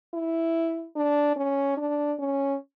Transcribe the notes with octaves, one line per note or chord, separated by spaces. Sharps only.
E4
D4
C#4
D4
C#4